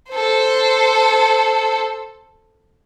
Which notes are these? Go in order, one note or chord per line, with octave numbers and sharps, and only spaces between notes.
A4 C5